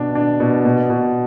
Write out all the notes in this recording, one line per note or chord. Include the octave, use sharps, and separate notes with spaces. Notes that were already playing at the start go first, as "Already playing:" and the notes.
Already playing: B2 D4
D4
B2
B2
B2